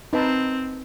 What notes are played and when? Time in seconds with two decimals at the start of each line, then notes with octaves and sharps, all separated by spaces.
0.13 C4 D#4 B4 A5